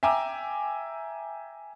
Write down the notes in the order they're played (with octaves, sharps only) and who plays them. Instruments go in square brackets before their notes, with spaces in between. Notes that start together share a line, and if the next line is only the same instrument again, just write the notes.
[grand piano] E5 G5 G#5 A#5 D6 E6